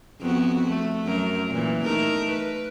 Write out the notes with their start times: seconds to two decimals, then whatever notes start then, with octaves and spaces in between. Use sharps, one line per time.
0.21 F2 B3 F#4
0.68 A3
1.05 F#2 A#4
1.49 A#2 E3
1.83 A3 D#4 A#4
2.29 B4